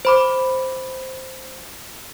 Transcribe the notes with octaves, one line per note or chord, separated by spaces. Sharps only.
C5 B5 D6